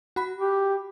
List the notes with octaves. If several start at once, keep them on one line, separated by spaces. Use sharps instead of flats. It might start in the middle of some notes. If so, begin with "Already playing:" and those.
F#4 B5
G4